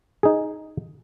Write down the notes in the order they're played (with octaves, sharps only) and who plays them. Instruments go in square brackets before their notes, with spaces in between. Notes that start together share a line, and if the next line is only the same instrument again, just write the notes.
[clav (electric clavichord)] D#4 G#4